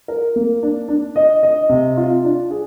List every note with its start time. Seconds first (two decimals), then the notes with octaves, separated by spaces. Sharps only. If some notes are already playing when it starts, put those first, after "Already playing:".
0.08 A#4
0.36 A#3
0.63 D4
0.89 D4
1.16 D#5
1.43 D#5
1.69 C3
1.97 F4
2.24 D4
2.51 G#4